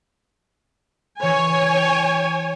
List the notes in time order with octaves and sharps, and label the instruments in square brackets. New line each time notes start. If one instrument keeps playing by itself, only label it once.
[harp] E3 [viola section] C#5 G#5